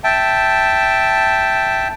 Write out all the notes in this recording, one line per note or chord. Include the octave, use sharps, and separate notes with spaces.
E5 G5 A5